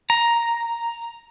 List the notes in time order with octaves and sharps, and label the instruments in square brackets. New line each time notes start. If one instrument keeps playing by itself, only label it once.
[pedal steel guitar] A#5